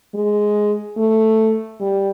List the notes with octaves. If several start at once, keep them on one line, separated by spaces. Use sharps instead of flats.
G#3
A3
G3